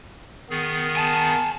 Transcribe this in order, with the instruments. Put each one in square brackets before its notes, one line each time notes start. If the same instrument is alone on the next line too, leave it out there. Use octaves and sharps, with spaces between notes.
[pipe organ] D#3 B3 G#4
[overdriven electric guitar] G#5 A5